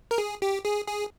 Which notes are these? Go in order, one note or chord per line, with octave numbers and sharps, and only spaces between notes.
A#4
G#4
G4
G#4
G#4